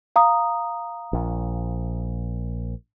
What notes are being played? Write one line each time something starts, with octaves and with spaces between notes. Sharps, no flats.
F5 A#5 D#6
A#1